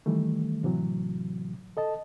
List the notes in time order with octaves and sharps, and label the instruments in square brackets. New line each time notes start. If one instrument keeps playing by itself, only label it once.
[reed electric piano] D#3 E3 G3 A3
A2 C3 E3 F#3
A4 D#5 A5